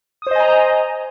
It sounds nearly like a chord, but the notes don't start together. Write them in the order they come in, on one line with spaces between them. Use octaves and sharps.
D#6 C5 D#5 G#5 A#5